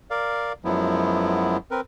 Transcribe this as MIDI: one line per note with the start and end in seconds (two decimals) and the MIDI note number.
0.10 0.52 70
0.10 0.52 74
0.10 0.52 77
0.65 1.57 42
0.65 1.57 53
0.65 1.57 54
0.65 1.57 56
0.65 1.57 59
0.65 1.57 64
1.71 1.81 60
1.71 1.81 70
1.71 1.81 71